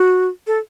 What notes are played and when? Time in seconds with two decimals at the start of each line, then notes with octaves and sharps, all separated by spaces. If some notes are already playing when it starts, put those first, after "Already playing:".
Already playing: F#4
0.47 A4